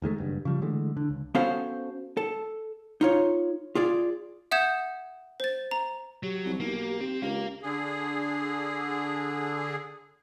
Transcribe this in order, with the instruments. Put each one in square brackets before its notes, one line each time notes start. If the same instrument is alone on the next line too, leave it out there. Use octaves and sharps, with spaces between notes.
[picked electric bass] F1 D#3 G#3 A3
F#1 G2
C#3 F3 G3
D3 E3 G#3 A3
D3
C#2
[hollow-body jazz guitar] B3 C#4 F#4 A4 C5 F5
A4
D#4 F4 C#5
F4 G#4 D5
[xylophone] E5 F#5 D#6 G6 G#6 E7
C5 A6
A#5
[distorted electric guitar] F#3 [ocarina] G4
[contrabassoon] C2
[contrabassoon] B1 [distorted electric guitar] A#3
[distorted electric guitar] C4
[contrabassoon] C#2 [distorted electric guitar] A#4 F5
[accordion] D3 G#4